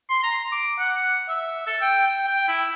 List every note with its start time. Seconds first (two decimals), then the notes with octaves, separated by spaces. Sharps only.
0.10 C6
0.23 A#5
0.52 D6
0.78 F#5
1.28 E5
1.67 A4
1.81 G5
2.07 G5
2.28 G5
2.48 E4